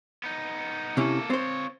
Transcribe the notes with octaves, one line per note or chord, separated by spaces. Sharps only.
B3 D#4
C3 A#3 C#4 E4 A4
C4 F4 C5 C#5